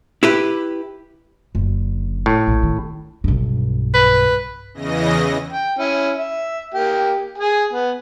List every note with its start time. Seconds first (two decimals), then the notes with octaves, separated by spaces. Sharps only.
0.23 E4 G4 B4
1.55 F#1 D3
2.26 A2
2.47 A#1
2.63 D#3
3.24 B1 G2
3.94 B4
4.74 E2 C#3 E3 D#5 A#6
5.52 G5
5.79 C#4 E4
6.17 E5
6.74 A#3 G4
7.38 G#4 G#5
7.73 B3